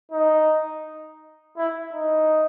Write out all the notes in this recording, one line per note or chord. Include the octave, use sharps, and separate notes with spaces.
D#4
E4
D#4